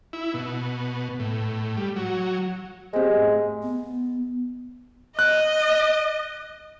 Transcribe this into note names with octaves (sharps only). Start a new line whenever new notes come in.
E4
B2
A2
G3
F#3
G#3 C4 G4
A2
B3
D#5 F#6